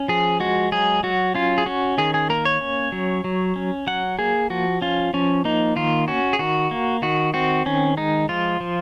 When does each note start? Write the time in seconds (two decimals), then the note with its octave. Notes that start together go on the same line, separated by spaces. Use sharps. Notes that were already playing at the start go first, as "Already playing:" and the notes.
Already playing: C#4
0.08 F3 G#4
0.40 G#3 F#4
0.72 F#3 G#4
1.03 F#3 F#4
1.35 C#4 F4
1.58 G#4
1.66 C#4 F#4
1.98 D#3 G#4
2.14 G#4
2.30 A#3 A#4
2.45 C#5
2.61 C#4
2.92 F#3
3.24 F#3
3.56 C#4
3.87 F#3 F#5
4.19 A#3 G#4
4.50 F3 F#4
4.81 C#4 F4
5.14 F3 C#4
5.45 A#3 D#4
5.76 D#3 F4
6.08 C#4 F#4
6.33 G#4
6.39 D#3 F#4
6.71 A#3
7.02 D#3 F#4
7.34 C4 F#4
7.66 D#3 C#4
7.97 G#3 D#4
8.29 F3 F4
8.60 F3